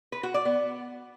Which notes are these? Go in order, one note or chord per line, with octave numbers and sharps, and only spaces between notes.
B4
F#4
D5
B3